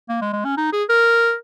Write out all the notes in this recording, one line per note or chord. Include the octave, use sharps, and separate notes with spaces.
A#3
G#3
G#3
C#4
D#4
G#4
A#4